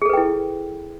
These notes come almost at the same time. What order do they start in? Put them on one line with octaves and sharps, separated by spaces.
G#4 A4 B4 G5 E4